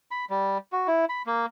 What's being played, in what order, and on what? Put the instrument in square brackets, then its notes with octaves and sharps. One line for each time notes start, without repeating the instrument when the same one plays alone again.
[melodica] B5
G3
F#4
E4
B5
A#3